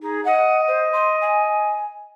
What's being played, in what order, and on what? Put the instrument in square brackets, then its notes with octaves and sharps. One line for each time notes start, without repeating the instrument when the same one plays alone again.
[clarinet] D#4 [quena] G#4
[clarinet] D#5 [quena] F#5
[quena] C5
C6
G#5